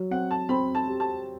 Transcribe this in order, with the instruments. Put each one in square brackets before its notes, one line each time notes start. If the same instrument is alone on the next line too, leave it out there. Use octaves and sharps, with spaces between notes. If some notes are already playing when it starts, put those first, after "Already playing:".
Already playing: [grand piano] F#3
[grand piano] C4 [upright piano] F#5
[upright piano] A5
[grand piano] C4 [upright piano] B5
[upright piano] A5
[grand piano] G4
[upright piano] A5